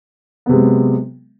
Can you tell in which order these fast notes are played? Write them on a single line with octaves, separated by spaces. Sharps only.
B3 C3 G#3 F#3